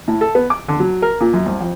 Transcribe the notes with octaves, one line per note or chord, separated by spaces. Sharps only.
A2
A4
B3
D6
D3
F#3
A#4
A#2
F#2
C2
F2